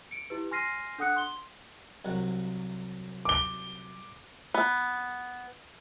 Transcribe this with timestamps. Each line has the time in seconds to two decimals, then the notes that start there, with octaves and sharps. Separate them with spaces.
0.11 C#7 D7
0.30 E4 G4 B4
0.51 G#5 C6 F6 A#6 C7 D#7
0.98 D4 A4 F#5 D#6 F#6 C#7
1.16 C6 G7
2.05 C2 F#3 F#5
3.25 D6 G7
4.54 B3